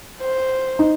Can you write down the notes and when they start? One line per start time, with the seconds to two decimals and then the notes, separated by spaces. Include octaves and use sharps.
0.21 C5
0.79 D#4